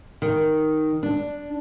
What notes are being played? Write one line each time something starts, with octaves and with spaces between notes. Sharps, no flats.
D#3
D4